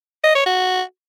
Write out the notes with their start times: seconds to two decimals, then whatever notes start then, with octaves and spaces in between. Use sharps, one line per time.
0.24 D#5
0.35 C#5
0.46 F#4